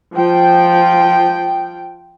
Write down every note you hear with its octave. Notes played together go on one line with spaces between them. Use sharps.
F3 G5